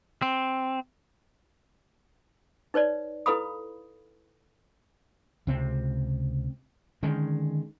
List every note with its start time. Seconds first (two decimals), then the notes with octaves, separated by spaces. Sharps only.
0.22 C4
2.74 D#4 B4 C#5 D5
3.26 E4 A4 B4 F5 B5 D#6
5.47 C#2 C3 C4
7.03 D3 D#3 G#3 C#4